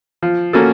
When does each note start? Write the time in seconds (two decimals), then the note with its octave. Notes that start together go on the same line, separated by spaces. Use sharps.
0.23 F3
0.53 A#3 C#4 F#4 A4